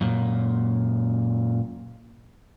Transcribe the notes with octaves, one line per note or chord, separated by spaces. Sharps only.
F#2 A#2